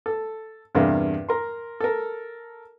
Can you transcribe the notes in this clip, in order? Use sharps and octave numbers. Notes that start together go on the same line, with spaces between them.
A4
E2 G2 C3 G#4 A#4 F5
A#4 A#5 C6
A4 A#4